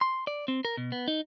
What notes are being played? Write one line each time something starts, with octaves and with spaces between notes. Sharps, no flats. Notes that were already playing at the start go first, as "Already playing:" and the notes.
C6
D5
C4
A#4
B2
B3
D#4